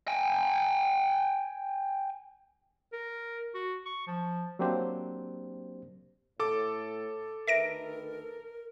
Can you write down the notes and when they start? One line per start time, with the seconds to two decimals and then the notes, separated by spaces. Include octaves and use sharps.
0.08 G5 G#5
2.93 A#4
3.55 F#4
3.86 C#6
4.07 F3
4.59 F#3 A#3 C4 D4 G4 C5
6.40 A2 A4 D6
7.47 D2 D#3 A#4 B4 E5 A#6 D7